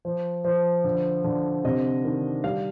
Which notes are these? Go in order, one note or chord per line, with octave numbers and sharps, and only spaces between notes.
F3
F3
D3
D3
C3 D#5
D#3
G3 F5